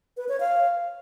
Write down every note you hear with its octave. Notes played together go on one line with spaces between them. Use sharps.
B4
C#5
F5